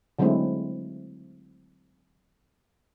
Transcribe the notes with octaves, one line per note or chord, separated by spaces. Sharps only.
D3 F#3 G#3 A3 C4 E4